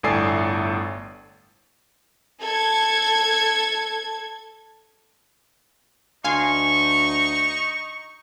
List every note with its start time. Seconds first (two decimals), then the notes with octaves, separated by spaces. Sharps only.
0.03 G1 A2 A4 D5 G#5 C7
2.41 A4 G#6
6.24 D2 D#4 F5 G#5 C6 C#6